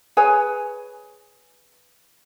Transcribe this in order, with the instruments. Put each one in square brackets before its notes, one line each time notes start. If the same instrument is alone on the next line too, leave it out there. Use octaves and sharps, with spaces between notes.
[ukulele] G#4 B4 C#5 G#5